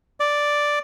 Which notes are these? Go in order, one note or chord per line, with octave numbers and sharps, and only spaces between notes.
D5